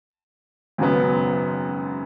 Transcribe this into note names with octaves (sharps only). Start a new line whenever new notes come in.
G#1 F#2 C#3 F#3 B3